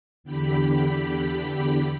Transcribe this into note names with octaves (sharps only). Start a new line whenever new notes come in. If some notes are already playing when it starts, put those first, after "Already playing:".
E2 D3 G4 B5 B6